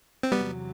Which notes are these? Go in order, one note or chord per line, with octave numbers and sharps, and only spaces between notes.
C4
E2 C3 F#3 G3 B3